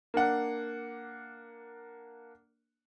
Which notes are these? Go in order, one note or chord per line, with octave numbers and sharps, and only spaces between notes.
A#3 D4 F#5